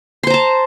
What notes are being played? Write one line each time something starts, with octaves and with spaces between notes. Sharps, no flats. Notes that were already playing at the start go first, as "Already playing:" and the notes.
C5 A5 A#5 C6